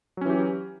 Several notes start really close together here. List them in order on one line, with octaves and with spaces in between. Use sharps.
F#3 C#4 E3 G4